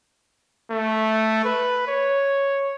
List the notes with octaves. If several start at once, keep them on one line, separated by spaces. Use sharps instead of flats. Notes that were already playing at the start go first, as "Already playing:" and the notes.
A3
B4
C#5